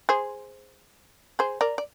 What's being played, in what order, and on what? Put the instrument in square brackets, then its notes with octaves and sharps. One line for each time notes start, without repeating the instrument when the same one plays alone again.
[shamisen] G#4 C5
G#4 C5
A#4 D5
D5